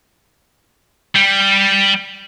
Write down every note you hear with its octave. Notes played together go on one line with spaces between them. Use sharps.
G3